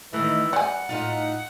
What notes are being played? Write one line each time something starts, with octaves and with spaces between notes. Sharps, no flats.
D#3 E3 A3
G3 D5 F#5 G#5
A2 D#4 F4